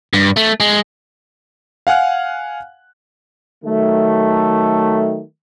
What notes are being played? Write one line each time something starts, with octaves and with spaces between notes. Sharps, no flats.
G2
A3
G#3
F5 F#5 G#5 F6 F#6
D#3 F#3 A3